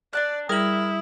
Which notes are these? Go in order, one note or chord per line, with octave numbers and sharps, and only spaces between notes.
D4 D5 A5 F#6
G3 E4 G#4 A#4 D#6 F#7